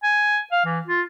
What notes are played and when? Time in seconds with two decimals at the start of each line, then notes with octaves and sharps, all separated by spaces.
0.03 G#5
0.52 F5
0.65 E3
0.87 F4